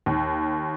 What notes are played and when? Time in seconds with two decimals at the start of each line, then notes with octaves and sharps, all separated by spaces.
0.06 D#2